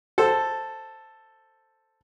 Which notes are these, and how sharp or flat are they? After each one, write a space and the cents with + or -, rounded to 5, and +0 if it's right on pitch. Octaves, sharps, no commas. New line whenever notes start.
A4 +0 C5 +0